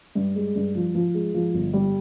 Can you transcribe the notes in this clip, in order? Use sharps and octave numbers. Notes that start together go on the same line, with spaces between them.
G2
G#3
G2
F3
F3
G#3
F3
G1
G3